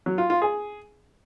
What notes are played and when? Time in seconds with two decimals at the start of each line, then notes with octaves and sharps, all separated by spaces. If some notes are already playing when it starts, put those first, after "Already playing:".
0.06 F#3
0.18 F4
0.30 F4
0.42 G#4